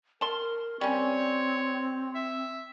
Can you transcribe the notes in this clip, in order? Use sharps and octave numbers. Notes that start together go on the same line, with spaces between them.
A#4 A5 C6
G3 C4 C#4 C#5
E5